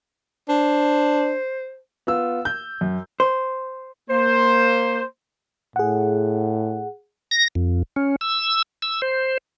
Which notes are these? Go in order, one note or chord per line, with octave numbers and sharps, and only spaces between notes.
D4 C5
B3 F4 E6
G6
F#2
C5
A#3 C5
A2 G#4 F#5
A#6
F2
C#4
E6
E6
C5